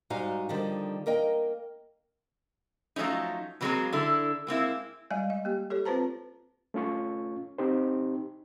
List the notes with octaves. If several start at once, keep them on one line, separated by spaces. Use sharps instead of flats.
G#2 G3 D#4 F#4 F5 G#5
D3 D#3 F3 G3 D#4
A#3 A#4 D#5 G5
F3 F#3 A3 C#4 D#4
B2 E3 F#3 G#3 A#3 C4
D3 E4 A4
G#3 A#3 C4 E4
G3 G#3 D5 D#5 F5 G#5
D#5
A#3 G4
G4 A4 C#5
C4 F4 B4 C5 A5 A#5
A3 C#4 F4 C#6
C4 D#4 G4 C5